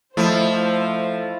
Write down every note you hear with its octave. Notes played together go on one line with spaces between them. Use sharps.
F3 A3 E4 C5 D#5 E5 C6